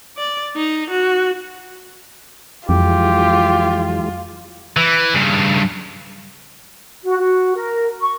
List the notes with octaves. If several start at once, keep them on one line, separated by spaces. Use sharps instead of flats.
D5
D#4
F#4
F2 E3 F#3 G#3 F4 G4
E3
G2 C#3
F#4
F#4
A#4
C#6